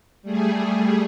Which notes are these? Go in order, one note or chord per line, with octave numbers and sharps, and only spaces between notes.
G3 A3 G#4